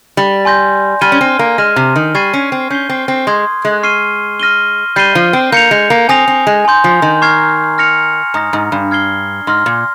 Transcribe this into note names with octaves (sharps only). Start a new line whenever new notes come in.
G3
G#5 C6 G6 A#6
G3 F6 G#6 D#7 G7
C#4
C4
A#3
G#3 F6 A#6 D#7
C3
D#3
G3 C#6 G#6 C7 D#7
C#4
C4
C#4 G6 C7 G7
C4
C4
G#3 C6 D#6 G#6
G#3
C#6 F6 C7 D#7 G7
F6 A#6 D#7 G7
G3 G6 C7 D#7 G7
F3
C4
A#3 G6 C#7 F7
G#3
A#3
C4 G#5 D#6 A#6 F7
C4
G#3
G#5 C6 G6
F3
D#3
A#5 C#6 F6 G#6 C7
F6 A#6 C#7 F7
G#2 A#5 D#6 A#6
G#2
G2
F6 G#6 C7 G7
G#2 C6 F6 A#6
A#2